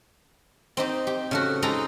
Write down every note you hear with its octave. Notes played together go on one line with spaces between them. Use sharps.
C4 D#4 G4
G4
C#3 A3 F#4
G#3 D#4 G4 A4 A#5